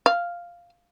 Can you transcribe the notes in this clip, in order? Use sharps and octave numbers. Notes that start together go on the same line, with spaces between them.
F5